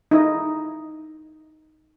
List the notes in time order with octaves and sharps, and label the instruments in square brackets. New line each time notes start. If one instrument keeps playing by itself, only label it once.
[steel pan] D#4 E4 D#5